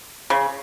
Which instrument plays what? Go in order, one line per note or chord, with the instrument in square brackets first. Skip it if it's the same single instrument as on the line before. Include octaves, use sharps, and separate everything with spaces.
[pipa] C#3